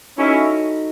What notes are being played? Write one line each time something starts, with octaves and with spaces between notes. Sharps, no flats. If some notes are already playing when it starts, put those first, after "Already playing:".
C#4 D#4 E4 F#4 A4 D#5